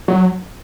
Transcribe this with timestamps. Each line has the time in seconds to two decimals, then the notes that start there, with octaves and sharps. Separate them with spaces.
0.08 F#3